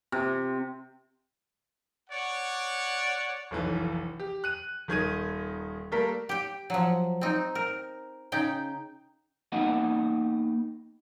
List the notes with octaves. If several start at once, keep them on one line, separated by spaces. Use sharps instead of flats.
C3
C#5 D5 F#5
F1 B1 E3
G4
F#6 D#7
D#1 D#3 G#6 D#7
G3 A3 A#3 A#4 B6
G4 G5
F3 F#3
C4 D#4
A#4
C#3 D#4 G5
A#3 B3 D#4 D#5 F#5